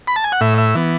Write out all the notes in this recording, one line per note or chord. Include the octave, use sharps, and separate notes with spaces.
B5
A5
G#5
F#5
A2 E5
E5
E3 B3